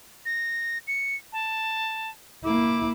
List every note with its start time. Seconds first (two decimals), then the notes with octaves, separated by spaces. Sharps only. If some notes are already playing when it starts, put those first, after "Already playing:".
0.25 A#6
0.87 C#7
1.32 A5
2.44 A#3 E4 D6